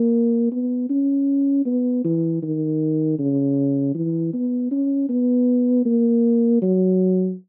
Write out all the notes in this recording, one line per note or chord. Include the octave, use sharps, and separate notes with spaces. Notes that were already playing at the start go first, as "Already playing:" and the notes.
Already playing: A#3
B3
C#4
B3
E3
D#3
C#3
E3
B3
C#4
B3
A#3
F#3